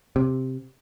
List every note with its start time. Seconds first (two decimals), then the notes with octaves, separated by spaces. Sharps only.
0.16 C3